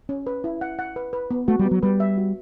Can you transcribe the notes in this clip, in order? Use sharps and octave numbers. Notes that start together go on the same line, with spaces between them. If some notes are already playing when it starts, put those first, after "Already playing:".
C#4
B4
E4
F#5
F#5
B4
B4
B3
A3 F#4
G3
B3
F#3
G3 B4
E5
F#4